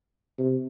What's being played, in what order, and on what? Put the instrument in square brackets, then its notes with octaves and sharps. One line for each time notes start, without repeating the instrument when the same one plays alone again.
[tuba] C3